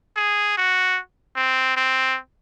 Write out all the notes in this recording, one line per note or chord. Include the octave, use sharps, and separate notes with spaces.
G#4
F#4
C4
C4